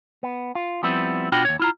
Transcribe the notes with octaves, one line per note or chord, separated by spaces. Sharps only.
B3
F4
F3 G3 B3 C4 E4
B2 D4 F4 F#4 G5 B5
D#2 C#5
E4 F4 A#5